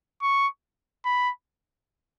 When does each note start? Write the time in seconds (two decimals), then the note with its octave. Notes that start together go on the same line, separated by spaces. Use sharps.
0.22 C#6
1.05 B5